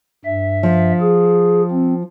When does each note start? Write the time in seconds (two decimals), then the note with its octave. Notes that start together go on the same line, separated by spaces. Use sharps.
0.25 G2 E5
0.63 F3
1.00 G#4
1.71 C4